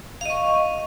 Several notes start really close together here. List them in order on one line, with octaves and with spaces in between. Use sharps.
F5 D#5 C#6